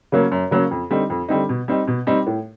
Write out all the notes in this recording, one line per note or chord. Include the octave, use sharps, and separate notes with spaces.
C#3 F#3 A#3 C#4
F#2
C#3 F#3 A#3 C#4
F2
D3 G3 C4 D#4
F2
D3 G3 C4 D#4
B2
G3 C4 D#4
B2
G3 C4 D#4
A2